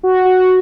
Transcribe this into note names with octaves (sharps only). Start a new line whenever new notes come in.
F#4
F#4